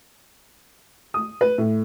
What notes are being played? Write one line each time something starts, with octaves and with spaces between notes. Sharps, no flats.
D#6
B4
A2